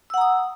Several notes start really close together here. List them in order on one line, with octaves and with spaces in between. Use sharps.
E6 F#5 A#5 D#6